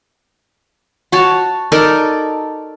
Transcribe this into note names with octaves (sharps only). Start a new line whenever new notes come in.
F#4 C#5 A5
D#4 A4 A#4 D5